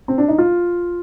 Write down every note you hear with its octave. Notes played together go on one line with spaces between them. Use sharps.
C4
D4
D#4
F4